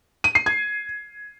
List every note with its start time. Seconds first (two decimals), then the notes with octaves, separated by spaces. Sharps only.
0.24 D#7
0.35 C7
0.46 G#6